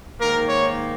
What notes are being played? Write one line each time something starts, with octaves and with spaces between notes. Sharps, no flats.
G#2 D#3 A#3 A#4
C#5